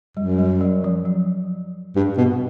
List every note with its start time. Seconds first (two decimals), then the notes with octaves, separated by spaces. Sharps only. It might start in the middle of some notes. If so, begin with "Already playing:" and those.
0.17 F#2 G3
0.39 G3
0.61 F#3
0.84 F3
1.05 F#3
1.95 G2
2.17 B2